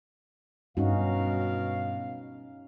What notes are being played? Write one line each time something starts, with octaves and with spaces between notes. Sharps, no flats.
G2 B2 C#4 D#4 F#4 F5